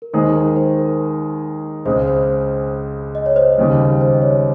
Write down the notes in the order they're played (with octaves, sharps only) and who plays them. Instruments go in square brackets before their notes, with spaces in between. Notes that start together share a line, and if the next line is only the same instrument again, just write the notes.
[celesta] A#4
[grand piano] D#2 D#3 G#3 D#4 G#4 [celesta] C5
[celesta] A#4
C5
C5
A#4
[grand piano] C#2 C#3 G#3 [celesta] C5
[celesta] C5
D#5
C#5
C5 D#5
[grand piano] D#2 C#3 G3
[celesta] C5
D#5
C#5